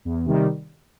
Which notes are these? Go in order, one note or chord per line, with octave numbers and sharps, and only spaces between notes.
E2
C3 D#3 G3